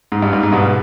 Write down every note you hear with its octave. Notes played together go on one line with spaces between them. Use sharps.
G#2
G2
G#2
G#2
G2 B2